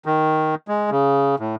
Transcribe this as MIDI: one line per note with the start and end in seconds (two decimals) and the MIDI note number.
0.06 0.55 51
0.68 0.90 56
0.91 1.36 49
1.39 1.55 45